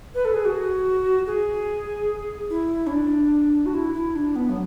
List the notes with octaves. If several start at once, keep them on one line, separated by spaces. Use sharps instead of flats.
B4
A4
G#4
F#4
G#4
E4
C#4
D4
F#4
E4
E4
D4
B3
F#3